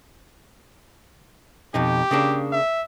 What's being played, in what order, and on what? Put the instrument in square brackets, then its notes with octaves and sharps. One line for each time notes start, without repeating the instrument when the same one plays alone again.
[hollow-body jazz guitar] F2 B2 D#4 [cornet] G4
[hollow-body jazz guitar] C#3 A#3 D4
[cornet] E5